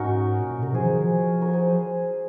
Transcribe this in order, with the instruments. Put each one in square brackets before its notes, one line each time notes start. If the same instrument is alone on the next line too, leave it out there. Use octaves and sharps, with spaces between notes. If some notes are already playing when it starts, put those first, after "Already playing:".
Already playing: [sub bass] G#2 [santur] C#4 D#4 F#4 A#4
[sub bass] A#2
A#2
[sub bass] C3 [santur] A#4
[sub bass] F3 [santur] G#4 C5
[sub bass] D#3
F3
[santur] A#4 C#5
G#4 C5